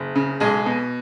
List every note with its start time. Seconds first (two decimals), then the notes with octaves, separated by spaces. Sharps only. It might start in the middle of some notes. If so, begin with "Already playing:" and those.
Already playing: F#1
0.16 C#3
0.40 B1 G#3 G#4
0.66 B2